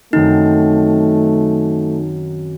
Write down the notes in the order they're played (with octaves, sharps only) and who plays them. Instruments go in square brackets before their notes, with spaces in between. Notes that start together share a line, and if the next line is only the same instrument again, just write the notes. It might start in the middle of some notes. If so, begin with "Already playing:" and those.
[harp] F#2 D#3 C4 [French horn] A3 [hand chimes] D#4